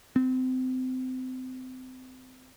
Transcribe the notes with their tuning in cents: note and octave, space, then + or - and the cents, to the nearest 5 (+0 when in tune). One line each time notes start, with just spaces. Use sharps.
C4 -30